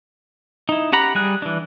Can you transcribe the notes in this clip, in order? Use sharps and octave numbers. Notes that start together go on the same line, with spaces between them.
D#4 E4
C#4 G4 F#5 A#5 B5
G3 G#4 F#6
E3 D4